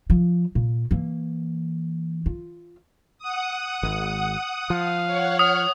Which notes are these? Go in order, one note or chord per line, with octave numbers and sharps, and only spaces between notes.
F3
A#2
E3 A#3
F4
F#5 D#6
G#1
F3 F5
C#5 F#5
D#6 F6